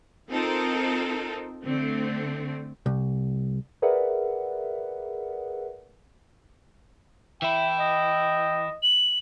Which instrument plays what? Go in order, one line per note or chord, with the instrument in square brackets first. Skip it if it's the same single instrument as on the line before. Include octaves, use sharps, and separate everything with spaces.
[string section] C4 D#4 F4 A4 A#4
D3 A3 C4
[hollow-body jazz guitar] C2
[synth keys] G#4 A#4 B4 D5 E5 F#5
[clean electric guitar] E3 E4 [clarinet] E5 [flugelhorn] G5
[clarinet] D#5
[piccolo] F#7